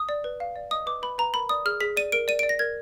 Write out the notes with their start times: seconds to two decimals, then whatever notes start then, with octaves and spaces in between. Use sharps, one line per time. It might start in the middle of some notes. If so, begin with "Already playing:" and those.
Already playing: D#6
0.09 D5
0.24 B4
0.40 F5
0.56 D5
0.71 D#5 D#6
0.86 B4 D6
1.02 B4 B5
1.18 B4 A#5
1.34 A#4 B5
1.49 D5 D#6
1.66 G#4 F6
1.80 G#4 B6
1.97 D5 D#7
2.12 A#4 D7
2.28 D5 D#7
2.39 D5 D7
2.49 A#6
2.59 A#4 G#6